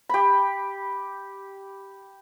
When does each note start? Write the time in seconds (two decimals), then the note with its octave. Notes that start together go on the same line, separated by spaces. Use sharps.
0.09 G4 B5